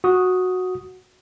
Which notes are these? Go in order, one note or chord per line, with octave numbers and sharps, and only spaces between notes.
F#4 D#6